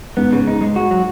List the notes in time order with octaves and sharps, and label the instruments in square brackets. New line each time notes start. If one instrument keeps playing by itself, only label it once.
[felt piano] G#2 [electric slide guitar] B3
[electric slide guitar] C#3
D#4
G#3
F#4
F#3